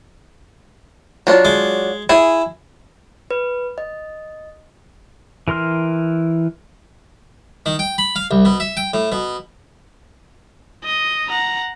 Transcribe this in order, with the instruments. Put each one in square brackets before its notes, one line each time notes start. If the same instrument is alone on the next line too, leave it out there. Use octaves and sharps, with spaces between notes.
[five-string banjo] F#3 D4 F4
[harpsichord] G#3
[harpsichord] E4 [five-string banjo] G#4
[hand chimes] B4
D#5
[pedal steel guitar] E3 A#4 C6 F6
[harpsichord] D#3
G5
B5
F5
C2
B2
E5
G5
A2
B2
[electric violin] D#5
F#5 A#5